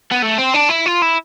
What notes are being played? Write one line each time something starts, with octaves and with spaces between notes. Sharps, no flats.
B3
A3
C4
D4
E4
F4
E4